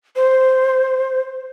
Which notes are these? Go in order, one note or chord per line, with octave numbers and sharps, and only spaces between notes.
C5